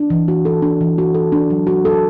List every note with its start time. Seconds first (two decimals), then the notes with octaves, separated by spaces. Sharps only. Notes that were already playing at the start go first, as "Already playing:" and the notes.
Already playing: D4
0.10 E3
0.28 F#4
0.45 A4
0.62 D4
0.81 E3
0.98 F#4
1.15 A4
1.32 D4
1.50 F#3
1.67 F#4
1.85 A4